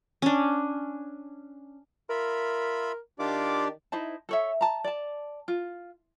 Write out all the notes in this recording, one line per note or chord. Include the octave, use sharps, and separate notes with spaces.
C#4 D4
F4 A#4 E5 B5
D#3 D4 F4 G4 D5 F5 D6
D#4 E4 C5 A5
A4 C#5 E5
A5 A#5
D5 A5
F4